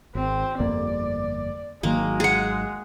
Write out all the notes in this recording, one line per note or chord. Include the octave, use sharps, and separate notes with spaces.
G#1 C4
G1 F2 A#3 D5
G#1 D#3 F#3 G#3 A#3
G#4 F#5